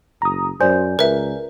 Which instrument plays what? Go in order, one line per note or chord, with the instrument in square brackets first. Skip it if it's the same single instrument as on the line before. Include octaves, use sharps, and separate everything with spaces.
[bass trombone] F#1 [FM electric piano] A#5 D#6
[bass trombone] F#2 [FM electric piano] C5 [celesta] D5 G#5 G6
[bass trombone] C#2 [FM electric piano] A#4 [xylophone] B4 E5